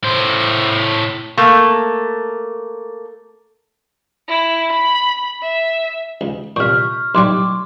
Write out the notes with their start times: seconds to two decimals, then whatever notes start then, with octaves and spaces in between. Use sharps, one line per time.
0.03 A2 C5
1.37 A3 A#3
4.28 E4
4.72 B5
5.42 E5
6.21 C#2
6.56 C2 A#2 C#6 F6
7.15 B1 A2 G3 C6 D6